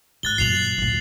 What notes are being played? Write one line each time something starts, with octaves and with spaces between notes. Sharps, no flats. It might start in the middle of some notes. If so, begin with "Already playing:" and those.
G#2 F#6 A6 G7
F#2 A#2 C7 F7 F#7
D2 A#2